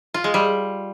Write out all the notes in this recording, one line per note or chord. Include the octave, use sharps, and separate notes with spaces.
F4
G#3
G3